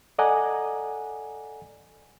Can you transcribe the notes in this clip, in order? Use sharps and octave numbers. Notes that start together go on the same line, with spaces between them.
A4 D5 D#5 F#5 G#5 A#5